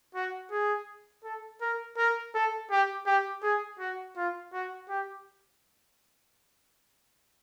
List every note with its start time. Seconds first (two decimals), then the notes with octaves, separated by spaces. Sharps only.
0.15 F#4
0.51 G#4
1.24 A4
1.62 A#4
1.98 A#4
2.35 A4
2.71 G4
3.07 G4
3.43 G#4
3.79 F#4
4.17 F4
4.53 F#4
4.89 G4